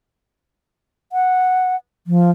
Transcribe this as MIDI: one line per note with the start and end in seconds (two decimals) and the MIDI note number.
1.12 1.76 78
2.07 2.31 53